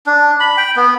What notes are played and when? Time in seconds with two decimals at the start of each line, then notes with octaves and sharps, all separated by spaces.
0.07 D4
0.40 B5
0.57 G5
0.77 B3